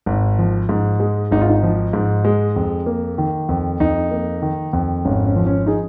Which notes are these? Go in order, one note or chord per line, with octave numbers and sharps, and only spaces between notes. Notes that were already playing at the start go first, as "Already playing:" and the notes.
G#1
F3
G#2
G#3
G#1 D#4
F4
D#4
F3
G#2
G#3
F2
A#3
D#3
F2
F2 D#4
A#3
D#3
F2
G#1 C#4
C#4
F3
C#4
D#4 G#4